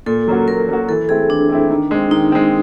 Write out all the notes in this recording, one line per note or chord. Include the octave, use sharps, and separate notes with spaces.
A#2 A4
F#3 A#3 C#4 F#4
A#2 A#4
F#3 A#3 C#4 F#4
E3 A4
A3 C4 E4 G#4
E3 D4
A3 C4 E4
D#3
G#3 C4
D#3 D#4
G#3 C4